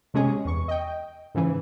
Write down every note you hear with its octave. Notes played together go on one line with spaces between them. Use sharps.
C3 G#3 C#4 G#4
E2 C#6
D#5 G5
G#2 C#3 E3